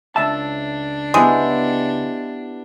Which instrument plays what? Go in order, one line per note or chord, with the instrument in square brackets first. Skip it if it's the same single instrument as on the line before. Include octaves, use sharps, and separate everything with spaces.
[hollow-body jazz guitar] C#2 E5 A5 [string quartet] D4
[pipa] G#3 [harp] B3 E4 G4